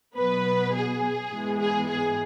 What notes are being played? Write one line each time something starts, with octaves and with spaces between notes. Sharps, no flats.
B2 F#3 B3 B4
G#4
G#2 E3 G#3 B3
G#4
G#4